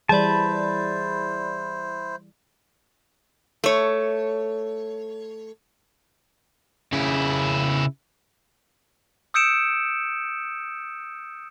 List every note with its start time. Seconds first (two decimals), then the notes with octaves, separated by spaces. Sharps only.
0.09 E3 G3 E4 G#4 C5 D5 A5 B5
3.64 A3 C#5
6.92 C#3 E4
9.34 D#6 E6 G6 C#7 D7 E7